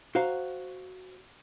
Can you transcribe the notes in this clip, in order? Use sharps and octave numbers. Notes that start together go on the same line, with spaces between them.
F#4 C5 F5 A#5